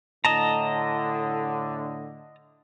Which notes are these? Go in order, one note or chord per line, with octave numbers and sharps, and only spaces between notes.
A2 D3 D#5 A5 A#5